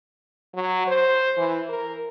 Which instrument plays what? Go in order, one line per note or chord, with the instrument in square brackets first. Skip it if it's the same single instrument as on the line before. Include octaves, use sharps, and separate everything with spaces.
[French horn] F#3
C5
E3
A#4